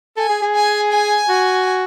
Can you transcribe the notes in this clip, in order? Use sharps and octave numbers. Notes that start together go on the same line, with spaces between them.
A4 G#5
G#4
G#4
G#5
G#5
F#4